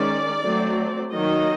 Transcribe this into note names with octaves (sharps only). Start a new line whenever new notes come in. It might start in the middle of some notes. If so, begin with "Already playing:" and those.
Already playing: D#3 G#3 C#4 D5
F#3 A3 C4
D#3 F#3 A#3 D#5